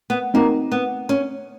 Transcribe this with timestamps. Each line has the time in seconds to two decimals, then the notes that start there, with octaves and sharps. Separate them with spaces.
0.10 B3
0.34 A#3 C4 D#4 F#4
0.72 B3
1.09 C#4